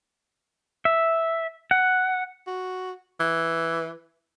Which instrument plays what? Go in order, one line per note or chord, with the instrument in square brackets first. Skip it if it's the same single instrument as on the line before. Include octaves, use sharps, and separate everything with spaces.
[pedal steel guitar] E5
F#5
[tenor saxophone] F#4
E3